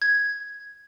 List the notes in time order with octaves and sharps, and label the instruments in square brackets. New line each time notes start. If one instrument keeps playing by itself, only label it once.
[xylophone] G#6